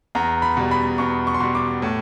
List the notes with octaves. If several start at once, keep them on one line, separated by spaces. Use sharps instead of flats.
E2 A#5
B5
B2 G3
B5
E2 C#6
C#6
C6
B2 G3 C#6
D6
A2